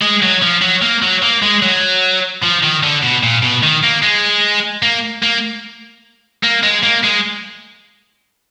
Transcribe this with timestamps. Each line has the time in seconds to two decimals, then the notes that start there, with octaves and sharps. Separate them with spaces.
0.02 G#3
0.23 F#3
0.42 F3
0.62 F#3
0.82 A#3
1.03 F#3
1.22 A#3
1.43 G#3
1.62 F#3
2.42 F3
2.63 D#3
2.83 D3
3.03 B2
3.23 A#2
3.43 B2
3.63 D#3
3.83 A#3
4.02 G#3
4.83 A#3
5.23 A#3
6.43 A#3
6.63 G#3
6.83 A#3
7.03 G#3